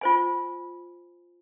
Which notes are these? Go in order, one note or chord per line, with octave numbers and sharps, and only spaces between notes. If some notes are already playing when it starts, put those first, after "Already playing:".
F4 C5 G#5